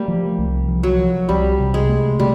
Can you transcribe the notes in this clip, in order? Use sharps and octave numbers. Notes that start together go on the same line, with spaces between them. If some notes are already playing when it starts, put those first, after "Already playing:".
Already playing: G3 A3 A#3
F3
C2
F3
F#3
F3
C2 G3
C3
G#3
A3
C3 G3